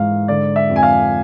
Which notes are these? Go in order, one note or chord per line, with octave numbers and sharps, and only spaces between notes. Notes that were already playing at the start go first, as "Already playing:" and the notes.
Already playing: G#2 E3 F5
D3 D5
E5
F2
G#5
F5